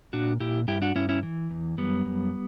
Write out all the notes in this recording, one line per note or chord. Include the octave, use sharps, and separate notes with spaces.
A#2 D4 F#4
A#2 E4 G4
G2 E4 G4
D4 F#4
G2 C#4 E4
C#4 E4
E3
E2
F#2 G3 B3
F#2